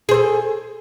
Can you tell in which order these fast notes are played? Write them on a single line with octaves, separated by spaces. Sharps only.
G#4 C5 A4